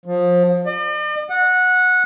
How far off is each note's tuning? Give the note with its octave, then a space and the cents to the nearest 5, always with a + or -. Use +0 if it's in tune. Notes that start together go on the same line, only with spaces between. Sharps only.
F3 +25
D5 +45
F#5 -15